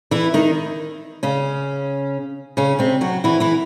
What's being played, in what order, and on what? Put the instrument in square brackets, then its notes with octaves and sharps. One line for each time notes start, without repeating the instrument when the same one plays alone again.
[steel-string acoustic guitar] E3 E4
D#3 D#4
C#3 C#4
C#3 C#4
C3 C4
F#3 F#4
E3 E4
E3 E4